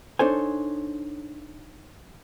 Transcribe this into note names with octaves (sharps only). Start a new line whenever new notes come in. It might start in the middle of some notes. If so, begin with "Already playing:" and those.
D4 D#4 A4 C5 C#5 G#5